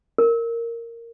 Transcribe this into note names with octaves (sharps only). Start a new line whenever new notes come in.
A#4